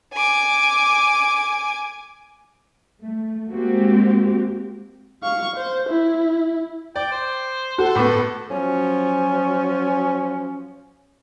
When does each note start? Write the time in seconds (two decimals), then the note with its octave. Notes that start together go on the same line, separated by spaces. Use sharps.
0.13 G#5 D6
3.01 A3
3.51 G#3 A#3 C4 F#4 G4
5.23 F5 C#6
5.56 C5
5.89 E4
6.96 D5 G5
7.12 C5
7.78 F#4 A4
7.95 A2 B3 D6
8.50 F3 F#3 C#4